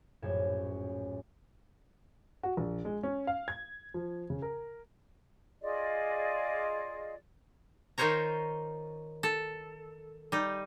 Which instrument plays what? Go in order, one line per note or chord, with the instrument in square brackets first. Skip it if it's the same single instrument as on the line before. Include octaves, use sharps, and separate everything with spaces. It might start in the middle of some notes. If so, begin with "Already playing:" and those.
[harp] A#1 F#2 A2 C#4 G#6 E7
[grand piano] F#4
A#1
G#3
C#4
F5
G#6
F3
C#3
A#4
[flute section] F4 G#4 D5 D#5
[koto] D#3 D#4 F4 C5 C#5 A#5
A4
G3 D#4